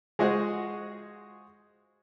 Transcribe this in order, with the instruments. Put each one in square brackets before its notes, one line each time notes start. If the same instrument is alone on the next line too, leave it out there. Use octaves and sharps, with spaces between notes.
[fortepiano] G#3 F4 F#4 G#4 C5 D#5